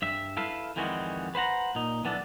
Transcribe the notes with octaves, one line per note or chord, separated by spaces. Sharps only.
G2 E5
E4 A4 B4 E5 F5
F2 D#3 E3 G3 G#3 F#4
B4 C5 F#5 A#5
A#2 D#4
B1 E3 B3 D4 A4